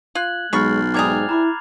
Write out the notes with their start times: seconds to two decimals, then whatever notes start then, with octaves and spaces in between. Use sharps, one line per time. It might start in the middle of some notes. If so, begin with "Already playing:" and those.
0.15 F4 F#6 G#6 F#7
0.53 B1 G#3 C#5 B5 C#6 F6 A6 C7
0.94 G#2 C3 G3 G#4 D6 G#6 F7
1.29 E4 A#5 B5 D6